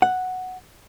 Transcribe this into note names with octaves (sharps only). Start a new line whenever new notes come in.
F#5